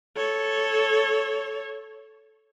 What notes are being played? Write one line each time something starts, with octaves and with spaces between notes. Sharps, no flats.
A4 C#5